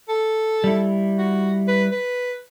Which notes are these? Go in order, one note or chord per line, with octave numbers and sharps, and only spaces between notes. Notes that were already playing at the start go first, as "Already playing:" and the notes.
A4
G3 E4
F#4
B4
B4